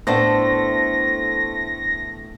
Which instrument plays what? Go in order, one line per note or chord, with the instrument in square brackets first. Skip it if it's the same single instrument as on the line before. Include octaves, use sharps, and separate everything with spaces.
[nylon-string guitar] A2 D4 [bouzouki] A3 C5 [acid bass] B3 [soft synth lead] A#6